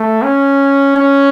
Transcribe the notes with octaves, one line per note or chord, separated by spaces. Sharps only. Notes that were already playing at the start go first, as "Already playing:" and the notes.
Already playing: A3
C#4
C#4